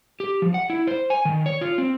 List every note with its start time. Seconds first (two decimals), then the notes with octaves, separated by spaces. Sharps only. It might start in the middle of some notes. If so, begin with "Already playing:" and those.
0.20 G4
0.42 F3
0.54 F#5
0.70 E4
0.87 C5
1.10 G#5
1.25 D#3
1.46 C#5
1.61 F4
1.78 C4